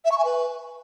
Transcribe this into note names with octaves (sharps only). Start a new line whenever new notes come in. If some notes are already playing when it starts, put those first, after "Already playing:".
E5
C#6
G#5
B4